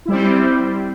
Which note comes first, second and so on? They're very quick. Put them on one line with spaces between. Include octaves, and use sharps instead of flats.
E4 G3 C5 C4